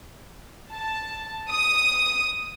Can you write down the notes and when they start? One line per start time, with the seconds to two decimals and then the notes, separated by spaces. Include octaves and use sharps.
0.72 A5
1.50 D#6